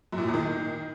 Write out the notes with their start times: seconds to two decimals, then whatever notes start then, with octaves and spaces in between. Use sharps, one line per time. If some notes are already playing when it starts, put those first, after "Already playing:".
0.12 F#2
0.18 A#2
0.23 A2
0.28 E2
0.34 D#3